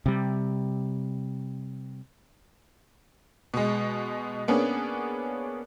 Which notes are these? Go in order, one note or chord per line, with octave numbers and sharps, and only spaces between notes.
C3 G3
B2 G#3
A#3 B3 C#4 D4 G#4